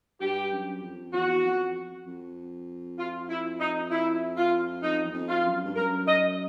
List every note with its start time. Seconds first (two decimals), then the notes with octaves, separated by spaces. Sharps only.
0.21 G2 G4
0.52 F#2
0.82 F2
1.13 E2 F#4
1.45 F2
2.06 F2
2.98 F4
3.30 E4
3.60 D#4
3.91 E4
4.37 F4
4.83 F2 D#4
5.05 E2
5.14 F2
5.29 F4
5.45 F#2
5.65 G2
5.76 F#2 A#4
6.07 D#5